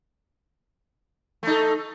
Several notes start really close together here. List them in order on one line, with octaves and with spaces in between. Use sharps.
A3 D#4 A4